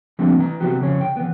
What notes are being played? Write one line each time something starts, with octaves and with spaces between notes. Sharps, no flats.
F3 G3 A3 A#3 C4 D4
E3 A#5
C3 F#3 B3 F#4 G4
F2 C#3 C#4 C#5
G5
E3 B3